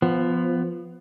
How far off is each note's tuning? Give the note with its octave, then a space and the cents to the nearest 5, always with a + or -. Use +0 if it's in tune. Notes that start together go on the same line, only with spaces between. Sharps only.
F3 -5 B3 +15